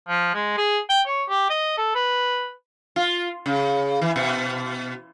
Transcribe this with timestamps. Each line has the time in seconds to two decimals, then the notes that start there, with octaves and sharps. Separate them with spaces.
0.09 F3
0.34 G#3
0.57 G#4
0.89 G5
1.06 C#5
1.29 G4
1.50 D#5
1.77 A4
1.95 B4
2.96 F4
3.46 C#3
4.02 E3
4.16 B2